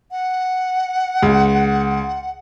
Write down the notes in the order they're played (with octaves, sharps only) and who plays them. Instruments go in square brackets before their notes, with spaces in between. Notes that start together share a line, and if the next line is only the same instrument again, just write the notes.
[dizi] F#5
[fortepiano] C#2